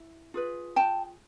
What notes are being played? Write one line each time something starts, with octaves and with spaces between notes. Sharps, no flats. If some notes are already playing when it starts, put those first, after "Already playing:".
Already playing: E4
F4 G#4 B4
G5 A5